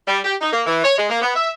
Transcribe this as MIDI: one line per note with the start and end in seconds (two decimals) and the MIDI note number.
0.08 0.20 55
0.25 0.35 67
0.41 0.49 63
0.53 0.62 58
0.66 0.79 52
0.84 0.97 73
0.98 1.10 56
1.10 1.21 58
1.22 1.32 59
1.35 1.51 76